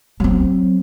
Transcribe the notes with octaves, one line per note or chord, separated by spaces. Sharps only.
F#3 C4